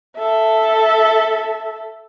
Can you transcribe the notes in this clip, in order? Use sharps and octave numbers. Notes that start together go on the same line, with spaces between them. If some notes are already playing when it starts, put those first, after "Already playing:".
A4 E5